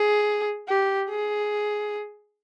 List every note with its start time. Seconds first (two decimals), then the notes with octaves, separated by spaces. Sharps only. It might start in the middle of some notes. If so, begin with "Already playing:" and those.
Already playing: G#4
0.68 G4
1.10 G#4